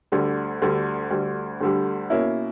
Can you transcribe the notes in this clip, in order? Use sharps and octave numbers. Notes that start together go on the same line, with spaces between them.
D2 D3 G3
D2 D3 G3
D2 D3 G3
D2 D3 G3
B2 A#3 C#4 E4